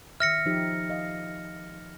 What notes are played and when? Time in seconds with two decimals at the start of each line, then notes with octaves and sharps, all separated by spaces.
0.20 D#3 E5 F6 A#6 C#7
0.46 F3 D#4 G4
0.90 D#5 F5